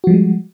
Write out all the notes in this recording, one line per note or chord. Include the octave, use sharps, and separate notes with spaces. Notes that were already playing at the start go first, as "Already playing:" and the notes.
F3 G3 G#3 F#4